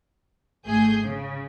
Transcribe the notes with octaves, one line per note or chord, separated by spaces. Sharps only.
G#1 A3 G#4 G6
C#3